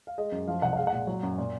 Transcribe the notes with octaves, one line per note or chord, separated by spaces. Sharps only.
F5
G#3 D#5
F#2
F3 F5
C2 F#5
F#5
G#3 F5
F#5
A#2
F#3
F#2
A#2